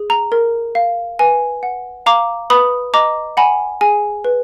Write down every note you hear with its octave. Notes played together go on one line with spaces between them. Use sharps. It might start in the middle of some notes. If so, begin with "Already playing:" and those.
Already playing: G#4
A#5
A#4
F5
B4 G#5
F#5
F5 A#5 D6
B4 B5 D#6
D#5 A#5 D6
F#5 G#5 B5
G#4 G#5
B4